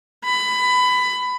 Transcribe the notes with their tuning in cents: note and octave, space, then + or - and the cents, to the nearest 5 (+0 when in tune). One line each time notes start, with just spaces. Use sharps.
B5 +20